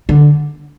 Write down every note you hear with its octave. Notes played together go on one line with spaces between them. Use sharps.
D3